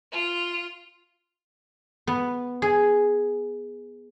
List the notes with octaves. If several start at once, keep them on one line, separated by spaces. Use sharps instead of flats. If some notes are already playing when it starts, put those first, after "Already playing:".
F4
B3
G#4